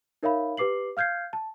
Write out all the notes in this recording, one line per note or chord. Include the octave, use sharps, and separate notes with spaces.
D#4 A#4 C#5 E5 F5 B5
G4 B4 D6 C7 F#7
F5 F6 G6 G#6 C7
A5